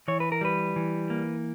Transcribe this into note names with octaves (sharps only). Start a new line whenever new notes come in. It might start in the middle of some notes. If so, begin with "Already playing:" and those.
E3 C#5
B4
A#4
G3 B4
E3
A#3